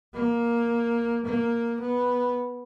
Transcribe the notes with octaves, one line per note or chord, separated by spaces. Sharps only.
A#3
A#3
B3